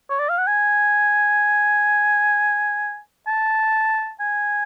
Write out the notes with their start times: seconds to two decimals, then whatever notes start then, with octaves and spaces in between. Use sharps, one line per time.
0.10 C#5
0.19 D5
0.29 F5
0.38 F#5
0.47 G#5
3.27 A5
4.20 G#5